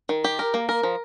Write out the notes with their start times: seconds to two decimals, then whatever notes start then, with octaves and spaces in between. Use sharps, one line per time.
0.09 D#3
0.24 G4
0.39 A#4
0.54 A#3
0.69 A#4
0.83 F3